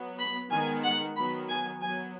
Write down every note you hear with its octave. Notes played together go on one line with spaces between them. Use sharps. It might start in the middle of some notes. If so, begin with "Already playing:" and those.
Already playing: F#3 B3
B5
D#3 G#3 B3 G#5
F#5
D#3 F#3 B3 B5
G#5
F#3 B3 G#5